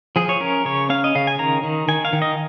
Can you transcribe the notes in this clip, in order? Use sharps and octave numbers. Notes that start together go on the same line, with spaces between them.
F3 G#4
C#5
C#4 A#4
C#3 C#5
C#4 F5
D#5
C#3 F5
G#5
D#3 A#5
D#3
D#3 G#5
F5
D#3
D#5